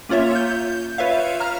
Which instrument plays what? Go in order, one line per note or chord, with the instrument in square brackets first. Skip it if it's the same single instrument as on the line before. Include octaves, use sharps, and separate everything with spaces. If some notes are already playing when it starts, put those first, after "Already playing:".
[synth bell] A#3 C#4 F4 C#5 E5
G6
F4 B4 C#5 E5 F5
A#5 F6